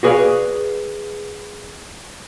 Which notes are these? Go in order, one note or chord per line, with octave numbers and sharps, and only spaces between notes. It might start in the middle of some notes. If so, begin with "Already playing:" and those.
F#4 G#4 B4 D5 F5